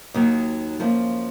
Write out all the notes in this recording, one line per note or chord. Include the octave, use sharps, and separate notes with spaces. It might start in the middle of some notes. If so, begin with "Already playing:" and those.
D#2 D#3 F#3
F#2 F3 A#3